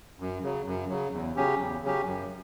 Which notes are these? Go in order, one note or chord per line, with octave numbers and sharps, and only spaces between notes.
F#2
C#3 F#3
F#2
C#3 F#3
E2
C#3 F#3 C#4 G4
E2
C#3 F#3 C#4 G4
F#2